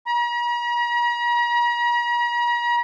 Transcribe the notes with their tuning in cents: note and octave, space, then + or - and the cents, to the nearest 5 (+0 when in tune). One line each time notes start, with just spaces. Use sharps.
A#5 +45